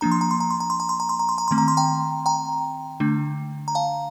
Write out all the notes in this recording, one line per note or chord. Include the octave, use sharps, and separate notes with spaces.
F3 A#3 D4 A#5
C6
A#5
C6
A#5
C6
A#5
C6
A#5
C6
A#5
C6
A#5
C6
A#5
D#3 A3 C4 C6
A#5
C6
G5 A#5
G5 A#5
D3 A3 D4
A#5
F5 A5